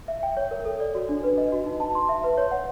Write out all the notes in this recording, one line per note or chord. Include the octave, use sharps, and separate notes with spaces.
E5
G5
C#5
A#4
A4
D5
F#4
D4
B4
D#5
F#4
D#4
A5
C6
E5
B4
C#5
F#5